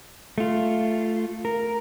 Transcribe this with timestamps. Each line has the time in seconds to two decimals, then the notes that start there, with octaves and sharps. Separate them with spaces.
0.38 A3 F4
1.45 A#4